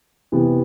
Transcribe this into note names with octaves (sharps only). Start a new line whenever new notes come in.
C3 E3 B3